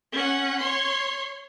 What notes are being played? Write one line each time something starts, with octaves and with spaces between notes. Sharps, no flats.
C#4 F#5
C#5 C6